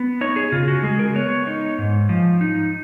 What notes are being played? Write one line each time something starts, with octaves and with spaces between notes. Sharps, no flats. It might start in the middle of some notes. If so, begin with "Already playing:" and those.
Already playing: B3
D#4 C#5
G#4
C#3 F4
F#4
G#3 G#4
A#4
B3 C#5
D#4
G#2
F3
D#4